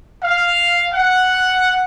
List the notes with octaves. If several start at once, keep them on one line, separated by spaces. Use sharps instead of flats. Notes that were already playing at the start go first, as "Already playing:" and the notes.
F5
F#5